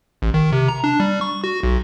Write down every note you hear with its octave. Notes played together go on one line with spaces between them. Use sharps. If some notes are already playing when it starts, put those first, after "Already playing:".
A1
D#3
C3
A#5
D4
G3
C#6
F#4
B1